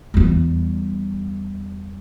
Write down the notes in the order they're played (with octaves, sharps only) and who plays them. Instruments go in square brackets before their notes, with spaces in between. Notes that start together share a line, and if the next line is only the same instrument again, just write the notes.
[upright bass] E2 G3